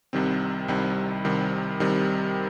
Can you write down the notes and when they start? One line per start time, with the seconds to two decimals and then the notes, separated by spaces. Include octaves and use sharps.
0.13 C2 C3 D#3 G3 C4
0.68 C2 C3 D#3 G3 C4
1.24 C2 C3 D#3 G3 C4
1.80 C2 C3 D#3 G3 C4